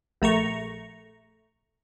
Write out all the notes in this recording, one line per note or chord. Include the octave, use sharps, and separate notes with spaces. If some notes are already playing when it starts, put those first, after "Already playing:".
A#1 A3 A#5 C#6